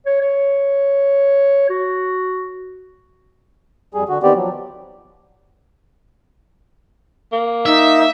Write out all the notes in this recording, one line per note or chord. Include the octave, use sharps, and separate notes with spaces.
C#5
C#5
F#4
F2 G3 G#4
D3 F#4
D#3 B3 C4 G4 D5
F3 F#3
A#3
D#4 E5